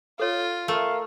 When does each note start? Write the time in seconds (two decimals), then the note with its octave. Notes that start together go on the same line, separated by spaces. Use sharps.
0.19 F4 A4 C#5
0.68 A3 A#4 F5